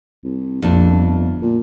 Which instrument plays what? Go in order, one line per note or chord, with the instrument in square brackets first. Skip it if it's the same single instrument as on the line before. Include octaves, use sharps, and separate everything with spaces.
[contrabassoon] C2
[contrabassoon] A#1 [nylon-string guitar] F2 A3 D4
[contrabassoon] G1
A#2